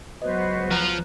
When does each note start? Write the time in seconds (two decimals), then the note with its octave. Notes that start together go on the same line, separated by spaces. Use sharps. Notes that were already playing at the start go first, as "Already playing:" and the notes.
0.22 C#2 F#3 B3 F#4 B4 C5 D#5
0.71 F3 A#5 F#6